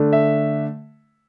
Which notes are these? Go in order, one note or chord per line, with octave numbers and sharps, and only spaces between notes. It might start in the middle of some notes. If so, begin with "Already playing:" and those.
Already playing: D3 A3 D4
E5